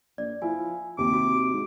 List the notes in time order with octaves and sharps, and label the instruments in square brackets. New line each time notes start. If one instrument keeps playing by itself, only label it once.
[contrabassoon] A#1 [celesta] D5
[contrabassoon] F3 [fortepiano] E4 [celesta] G#5
[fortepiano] D#2 [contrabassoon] C3 [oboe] D6
[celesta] F#4
[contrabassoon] G#2